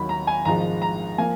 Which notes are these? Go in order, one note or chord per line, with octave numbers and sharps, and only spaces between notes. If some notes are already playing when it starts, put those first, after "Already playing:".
Already playing: D#2 D#3 F#3 B5
A#5
G#5
G#1 G#2 F3 G#3 A#5
A#5
F3 A#3 G#5